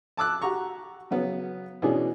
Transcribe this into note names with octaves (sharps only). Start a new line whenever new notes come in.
A5 D6 E6 F#6
F#4 G4 A#5 C#6
C#3 F#3 B3 C#4
B2 E3 C#4 D4 G#4